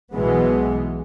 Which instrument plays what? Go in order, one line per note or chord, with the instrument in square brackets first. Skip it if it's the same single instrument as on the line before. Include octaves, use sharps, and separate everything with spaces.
[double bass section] B1 B2 E3 G#3 B3